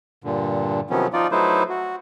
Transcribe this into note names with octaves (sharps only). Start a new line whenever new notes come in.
G2 A#2 D3
C3 D#3 F3 F#3 B3 C#4
F3 D#4 F4 D5
F#3 A3 D#4 E4 B4 C5
F#4